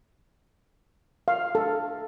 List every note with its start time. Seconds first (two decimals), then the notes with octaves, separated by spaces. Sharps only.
1.28 F5
1.55 A4